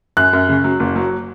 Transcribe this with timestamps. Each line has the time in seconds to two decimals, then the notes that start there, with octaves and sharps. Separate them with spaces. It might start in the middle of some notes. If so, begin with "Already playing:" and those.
0.17 F#2 F#6
0.33 F#2
0.49 C#3
0.64 F#3
0.80 F#1
0.96 F#3